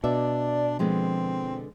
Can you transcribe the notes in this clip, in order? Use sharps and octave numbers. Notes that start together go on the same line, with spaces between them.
B2 D4 D5 E5
D3 F3 G#3 B3 C4